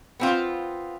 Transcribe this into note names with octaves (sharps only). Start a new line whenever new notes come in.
B3 C4 F4